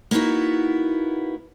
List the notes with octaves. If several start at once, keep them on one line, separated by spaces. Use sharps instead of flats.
A#3 B3 D#4 E4 F#4